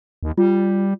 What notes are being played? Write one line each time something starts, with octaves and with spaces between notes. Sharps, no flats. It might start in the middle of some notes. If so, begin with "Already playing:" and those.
D#2
G3 F4